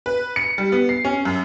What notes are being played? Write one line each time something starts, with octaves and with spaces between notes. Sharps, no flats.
B4
C#7
G3
B3
C7
C#4
F#2